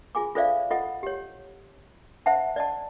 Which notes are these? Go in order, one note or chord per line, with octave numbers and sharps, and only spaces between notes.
F4 G#4 G#5 D6
F4 A4 C5 D5 E5 F5
F4 A4 D#5 F#5
G4 C#5
C5 E5 F#5 A5
D5 D#5 A5